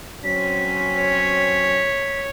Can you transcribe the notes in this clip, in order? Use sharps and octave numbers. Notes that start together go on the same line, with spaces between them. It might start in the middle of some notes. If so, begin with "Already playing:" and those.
F#3 C4 C#4 B6
C#5